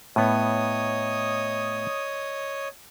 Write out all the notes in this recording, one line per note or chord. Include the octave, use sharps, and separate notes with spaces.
A2 B3 C#5 D#5 D#6